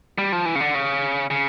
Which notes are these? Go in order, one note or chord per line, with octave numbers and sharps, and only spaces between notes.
G3
F3
E3
C#3
D3
C#3
C#3